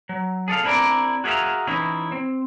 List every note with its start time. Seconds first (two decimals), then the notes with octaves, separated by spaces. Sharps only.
0.09 F#3
0.48 G#4 A4 D5 F5
0.64 C4 D4 E4 G4 A#4 D5
1.24 F#4 G#4 A#4 C5 E5 F5
1.67 E3 C#4 D#4 E4
2.12 C4